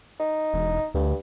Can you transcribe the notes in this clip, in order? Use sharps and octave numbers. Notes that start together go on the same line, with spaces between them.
D#4
E1
D2 G2